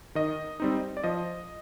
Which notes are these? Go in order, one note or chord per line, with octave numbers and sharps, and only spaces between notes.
D#3 D#5
G3 C4 D#4
D5
F3 D#5